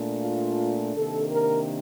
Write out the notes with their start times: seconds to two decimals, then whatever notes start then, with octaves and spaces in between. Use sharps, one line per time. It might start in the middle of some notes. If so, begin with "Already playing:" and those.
Already playing: A#2 A3 D4
0.22 F4
0.96 C3 D#3 A#3 D4 A4
1.33 A#4